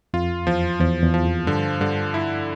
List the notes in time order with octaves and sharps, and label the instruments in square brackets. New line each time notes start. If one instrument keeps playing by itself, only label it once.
[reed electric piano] F2 [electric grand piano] F4
[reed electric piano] E2 [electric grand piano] F3
[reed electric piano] E2 [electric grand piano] F3
[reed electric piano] E2
[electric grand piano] F3
[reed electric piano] F2
[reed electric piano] G2 [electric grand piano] D3
[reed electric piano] G2 [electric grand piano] D3
[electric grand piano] E4